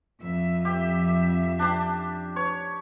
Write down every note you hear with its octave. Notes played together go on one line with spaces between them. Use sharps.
F2 E5
G4
D4 G4
C#5